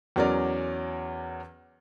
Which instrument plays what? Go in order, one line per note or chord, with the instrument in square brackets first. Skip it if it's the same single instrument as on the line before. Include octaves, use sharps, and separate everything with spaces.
[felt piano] E2 F#3 C#4 A#4 D5